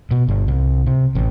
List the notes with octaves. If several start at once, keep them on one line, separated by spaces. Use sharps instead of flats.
B2
G1
C2
C3
A1